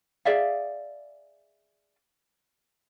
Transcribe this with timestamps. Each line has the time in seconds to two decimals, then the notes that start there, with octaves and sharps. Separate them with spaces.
0.25 G#4 D5 E5 F5